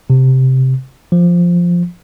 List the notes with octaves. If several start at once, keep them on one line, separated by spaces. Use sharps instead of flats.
C3
F3